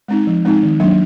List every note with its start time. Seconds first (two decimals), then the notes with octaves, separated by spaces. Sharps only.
0.08 G#3 C4 D#4
0.27 F3
0.45 G#3 C4 D#4
0.63 D#3
0.80 F#3 A#3 D4